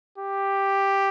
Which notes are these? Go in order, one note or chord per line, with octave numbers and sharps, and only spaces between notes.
G4